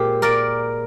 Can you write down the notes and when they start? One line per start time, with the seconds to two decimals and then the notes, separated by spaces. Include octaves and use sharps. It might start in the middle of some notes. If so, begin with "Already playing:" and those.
Already playing: A#2 G#3 G4 C5
0.22 A#4 D5